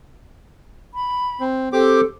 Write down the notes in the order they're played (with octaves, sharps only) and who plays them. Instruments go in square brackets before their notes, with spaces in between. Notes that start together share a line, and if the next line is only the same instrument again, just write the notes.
[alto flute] B5
[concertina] C4
[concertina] C4 G4 D6 [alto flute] A4